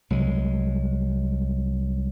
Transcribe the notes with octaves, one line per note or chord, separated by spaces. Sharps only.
C2 F#3 G#3